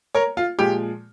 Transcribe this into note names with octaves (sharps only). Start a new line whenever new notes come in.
A#4 C#5
F4
A#2 F3 G#3 G4